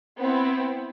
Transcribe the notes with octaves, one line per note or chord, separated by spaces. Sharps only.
B3 C4 E4